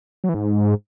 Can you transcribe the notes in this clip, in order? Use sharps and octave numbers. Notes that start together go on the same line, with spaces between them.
F#3
E3
G#2